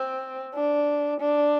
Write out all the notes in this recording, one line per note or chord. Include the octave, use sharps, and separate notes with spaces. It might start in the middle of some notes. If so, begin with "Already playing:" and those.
Already playing: C4
D4
D4